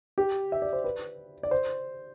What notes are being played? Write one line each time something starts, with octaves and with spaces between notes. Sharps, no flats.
G4
E5
D5
C5
B4
D5
C5